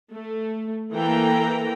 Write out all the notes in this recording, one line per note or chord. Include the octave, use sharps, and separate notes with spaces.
A3
E3 A#3 A4 G5 A#5